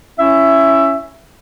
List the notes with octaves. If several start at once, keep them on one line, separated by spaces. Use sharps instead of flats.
C#4 E4 E5